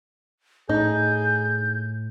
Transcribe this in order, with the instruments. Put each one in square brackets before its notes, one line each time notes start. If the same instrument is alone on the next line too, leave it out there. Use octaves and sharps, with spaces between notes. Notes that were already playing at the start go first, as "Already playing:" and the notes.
[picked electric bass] A2 [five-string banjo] D#4 [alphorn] G#4 [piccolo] G6